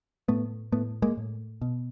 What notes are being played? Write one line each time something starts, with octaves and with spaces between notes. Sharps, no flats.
A2 A3 B3
A2 A3 B3
G#3 A#3
A2
B2